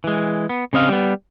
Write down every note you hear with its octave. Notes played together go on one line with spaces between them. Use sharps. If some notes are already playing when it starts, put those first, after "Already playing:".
E3 G#3
B3
C#3 C4 D#5 F5
G3 B3